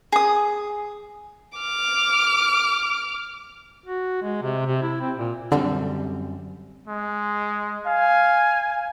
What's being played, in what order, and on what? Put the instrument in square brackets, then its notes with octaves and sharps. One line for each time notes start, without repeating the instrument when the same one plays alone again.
[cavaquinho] G#4 D#6
[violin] D6 F6
[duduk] F#4
G#3
C3
C3
E4
C4
A#2
[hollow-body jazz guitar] F#2 G3 C4 [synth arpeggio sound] D3
[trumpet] G#3
[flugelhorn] F5 [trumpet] G#5